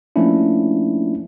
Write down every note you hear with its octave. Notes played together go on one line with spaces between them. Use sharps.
F3 A3 A#3 C#4 D4 E4